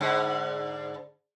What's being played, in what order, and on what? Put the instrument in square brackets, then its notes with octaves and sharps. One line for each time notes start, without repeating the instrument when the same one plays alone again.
[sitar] G#2 D3